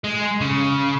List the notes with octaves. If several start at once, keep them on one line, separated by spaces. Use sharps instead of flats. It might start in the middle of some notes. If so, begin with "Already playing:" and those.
G#3
C#3